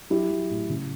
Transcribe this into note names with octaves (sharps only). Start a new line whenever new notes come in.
F#3 E4 G4
F#3
A2
C#3